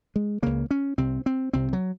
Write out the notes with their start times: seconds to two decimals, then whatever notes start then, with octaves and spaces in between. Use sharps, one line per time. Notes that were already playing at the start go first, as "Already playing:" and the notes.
0.16 G#3
0.42 C#2 C#3 A#3
0.71 C#4
0.98 C2 C3 C4
1.26 C4
1.53 C2 C3 C4
1.73 F#3